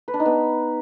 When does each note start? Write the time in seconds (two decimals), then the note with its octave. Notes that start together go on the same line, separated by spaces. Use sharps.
0.08 B4
0.14 D4
0.20 D#4
0.26 B3